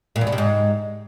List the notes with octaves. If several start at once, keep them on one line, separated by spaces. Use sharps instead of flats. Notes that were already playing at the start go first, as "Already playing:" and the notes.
A#2
E2
B2
C3
G#2